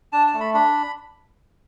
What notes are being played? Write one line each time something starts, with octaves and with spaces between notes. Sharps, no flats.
D4 A5
A5
A3
B5
D4 B5